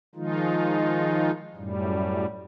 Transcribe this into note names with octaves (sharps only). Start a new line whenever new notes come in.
D#3 F3 G#3 D#4 F4
F#2 A2 G3